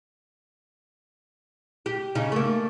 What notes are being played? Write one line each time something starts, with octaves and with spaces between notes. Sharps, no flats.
G4
C#3 D#4
A3 A#3